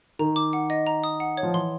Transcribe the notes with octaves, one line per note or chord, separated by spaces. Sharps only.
D#3 A#5
D6
F#5
D#5
A#5
D#6
F#5
C#5
F3
E3 C6